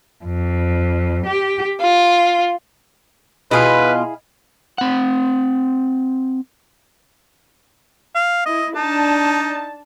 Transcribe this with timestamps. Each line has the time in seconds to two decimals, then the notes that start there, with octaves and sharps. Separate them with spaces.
0.25 F2
1.26 G4
1.80 F4
3.51 B2 E4 F4 G#4 B4 D#5 F5
4.78 C4 F#5
8.15 F5
8.46 E4 D#5
8.76 D4 D#4 A5